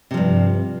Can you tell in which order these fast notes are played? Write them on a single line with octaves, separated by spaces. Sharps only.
C3 F3 G2